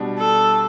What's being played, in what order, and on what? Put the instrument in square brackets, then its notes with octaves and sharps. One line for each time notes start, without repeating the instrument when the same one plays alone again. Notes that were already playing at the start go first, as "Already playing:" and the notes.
Already playing: [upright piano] B2 G3 D4
[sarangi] A4